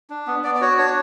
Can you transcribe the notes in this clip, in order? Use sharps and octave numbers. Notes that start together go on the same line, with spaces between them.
D4
B3
B3 D5
D5
F#4 C#5
D4 C#5